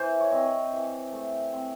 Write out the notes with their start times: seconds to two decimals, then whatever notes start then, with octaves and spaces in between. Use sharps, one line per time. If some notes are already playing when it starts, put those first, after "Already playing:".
Already playing: E3 C5
0.20 C#5
0.31 C4 D#5
0.73 E3
1.12 A3
1.53 C4